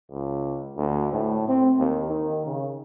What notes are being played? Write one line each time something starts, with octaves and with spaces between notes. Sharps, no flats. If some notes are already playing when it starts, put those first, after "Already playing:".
C#2
D2
A2
C4
D#2
D#3
C#3